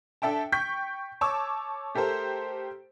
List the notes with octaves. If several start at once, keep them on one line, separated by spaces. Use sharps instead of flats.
D4 A4 E5 G5 A5
G5 C#6 G6 B6
C#5 A5 C#6 D6 E6
A3 G4 A4 A#4 C5